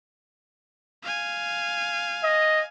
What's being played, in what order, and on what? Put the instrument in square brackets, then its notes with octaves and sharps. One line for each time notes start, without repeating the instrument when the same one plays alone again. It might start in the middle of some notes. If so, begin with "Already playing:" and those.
[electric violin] F5 G#5
[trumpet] D#5